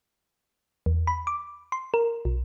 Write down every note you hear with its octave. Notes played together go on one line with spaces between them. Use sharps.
E2
B5
D6
C6
A#4
B1